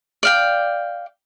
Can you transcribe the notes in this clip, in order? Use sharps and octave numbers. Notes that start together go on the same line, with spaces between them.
D5 F5 G5